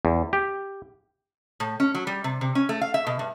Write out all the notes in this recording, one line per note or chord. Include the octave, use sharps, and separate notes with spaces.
E2
G4
A2
C#4
F#3
G3
C3
C3
C#4
A3
F5
E5
B2
G2